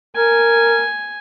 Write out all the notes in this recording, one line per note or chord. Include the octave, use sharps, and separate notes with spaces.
A#4 G#5